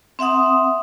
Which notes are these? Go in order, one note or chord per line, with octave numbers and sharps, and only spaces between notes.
C4 E5 F#5 D#6